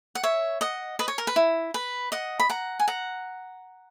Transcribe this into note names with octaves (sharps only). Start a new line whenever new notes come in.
F#5
C#5 E5
D#5 F#5
B4 D#5
C#5
A#4
B4
E4
B4
D#5 F#5
B5
F#5 A#5
G#5
F#5 A#5